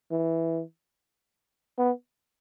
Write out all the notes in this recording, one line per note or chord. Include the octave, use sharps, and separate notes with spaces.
E3
B3